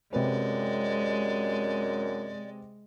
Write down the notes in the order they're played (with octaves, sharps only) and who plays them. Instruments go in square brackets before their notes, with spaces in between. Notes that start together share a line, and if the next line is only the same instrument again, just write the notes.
[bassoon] F#2 [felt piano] C3 B4 [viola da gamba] G#3 [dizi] D5